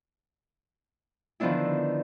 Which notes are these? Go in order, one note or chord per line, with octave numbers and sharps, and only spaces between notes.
D3 D#3 F3 B3 D4 E4